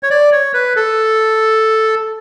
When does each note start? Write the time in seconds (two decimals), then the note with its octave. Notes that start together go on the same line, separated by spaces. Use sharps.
0.03 C#5
0.10 D5
0.32 C#5
0.54 B4
0.76 A4